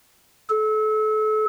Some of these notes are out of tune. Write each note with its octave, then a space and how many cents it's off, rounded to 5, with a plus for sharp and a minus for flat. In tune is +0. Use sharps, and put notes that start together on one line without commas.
A4 -30